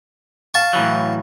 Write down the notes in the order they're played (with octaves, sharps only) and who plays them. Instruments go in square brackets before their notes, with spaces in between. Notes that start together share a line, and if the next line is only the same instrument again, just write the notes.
[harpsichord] F5 A5 C#6
[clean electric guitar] A2 E3 F#3